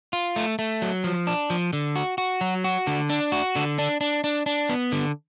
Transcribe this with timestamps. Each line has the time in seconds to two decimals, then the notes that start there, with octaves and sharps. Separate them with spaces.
0.13 F4
0.36 A3
0.59 A3
0.82 F#3
1.04 F3
1.27 D4
1.50 F3
1.73 D3
1.96 F#4
2.18 F#4
2.41 F#3
2.64 F#4
2.87 D3
3.10 D4
3.32 F#4
3.55 D3
3.79 D4
4.01 D4
4.24 D4
4.46 D4
4.69 B3
4.92 D3